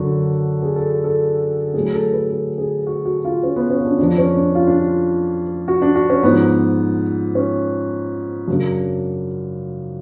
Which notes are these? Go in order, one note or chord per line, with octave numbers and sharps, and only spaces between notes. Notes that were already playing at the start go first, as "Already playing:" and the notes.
Already playing: F#2 D3 F#3 F#4
G#4
A4
A4
A2 F#3 G#4
A4
B4
A4
G#4
F#4
F#4
F4
C#4
B3
C#4
F4
D4
F2 F3 D4
C#4
D4
F4
D4
F4
F#4
D4
F#4
C#4
G#2 F3 B3
C#4
F#2 C#3 F#3 D4